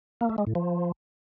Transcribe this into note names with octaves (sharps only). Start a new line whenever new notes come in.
A#3
A3
G#3
A2
F3